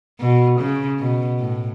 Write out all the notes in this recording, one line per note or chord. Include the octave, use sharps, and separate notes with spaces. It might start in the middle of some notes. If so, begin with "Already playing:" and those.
B2
C#3
B2
A2